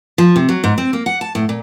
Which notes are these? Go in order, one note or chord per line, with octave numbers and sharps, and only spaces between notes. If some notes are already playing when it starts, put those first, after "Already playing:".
F3
C3
F#3
G#2
C4
A#3
F#5
A5
A2
A#2